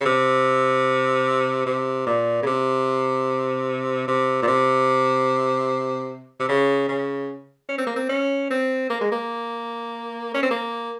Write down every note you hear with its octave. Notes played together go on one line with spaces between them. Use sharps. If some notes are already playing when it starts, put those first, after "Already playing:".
C#3
C3
C3
A#2
C#3
C3
C3
A#2
C3
C3
C#3
C#3
C#4
C4
A#3
C4
C#4
C4
A#3
G#3
A#3
C#4
C4
A#3